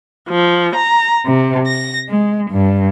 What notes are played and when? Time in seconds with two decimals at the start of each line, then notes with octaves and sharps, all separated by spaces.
0.30 F3
0.77 A#5
1.25 C3
1.66 A#6
2.08 G#3
2.50 G2